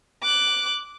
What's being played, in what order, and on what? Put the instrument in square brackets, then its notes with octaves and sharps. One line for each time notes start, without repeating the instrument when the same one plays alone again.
[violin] D6 F#6